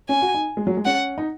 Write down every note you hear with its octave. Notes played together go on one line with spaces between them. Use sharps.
C#4 G#5
F#4
D#4
G#3
F#3
G#3
C#4 F#5
D#4